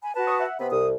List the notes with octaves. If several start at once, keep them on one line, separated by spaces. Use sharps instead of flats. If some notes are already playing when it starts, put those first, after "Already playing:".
G#5 B5
F#4 B4 A5
C#6 D#6
E5 F#5
C3 B3 C4 B5
C2 D#6